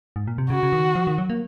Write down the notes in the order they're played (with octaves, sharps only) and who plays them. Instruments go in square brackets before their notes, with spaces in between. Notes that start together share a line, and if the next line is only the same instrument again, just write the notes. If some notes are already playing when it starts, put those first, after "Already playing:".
[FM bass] G#2
A#2
C3
[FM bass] C#3 [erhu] F#4
[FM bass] C#3
D#3
F3
D#3
F#3
A#3